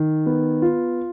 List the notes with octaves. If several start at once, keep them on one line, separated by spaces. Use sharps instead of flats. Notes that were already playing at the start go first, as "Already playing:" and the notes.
Already playing: D#3
B3
F4